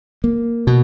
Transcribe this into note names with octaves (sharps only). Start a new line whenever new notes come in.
A#3
B2